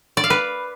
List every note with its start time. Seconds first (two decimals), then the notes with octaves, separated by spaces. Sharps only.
0.17 D5
0.24 F5
0.30 B4